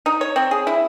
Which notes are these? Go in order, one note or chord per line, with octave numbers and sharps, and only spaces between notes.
D#4
C#5
C4
G#4
E4